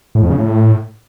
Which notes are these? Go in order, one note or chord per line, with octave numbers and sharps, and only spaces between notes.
A2
F2
C#3
A2